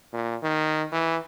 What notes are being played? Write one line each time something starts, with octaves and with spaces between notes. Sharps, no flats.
A#2
D#3
E3